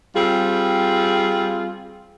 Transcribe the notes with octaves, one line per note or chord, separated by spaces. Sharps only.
G3 C4 F4 G#4